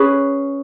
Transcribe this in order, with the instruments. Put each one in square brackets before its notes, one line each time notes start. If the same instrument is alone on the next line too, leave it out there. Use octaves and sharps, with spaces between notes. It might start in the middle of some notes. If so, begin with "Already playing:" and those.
Already playing: [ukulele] C#4 G#4 B4